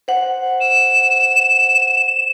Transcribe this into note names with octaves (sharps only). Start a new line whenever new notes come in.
C5 F#5
E7